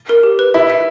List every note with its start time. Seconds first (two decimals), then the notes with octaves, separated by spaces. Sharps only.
0.09 A#4
0.23 G4
0.39 B4
0.54 E4 E5
0.70 E5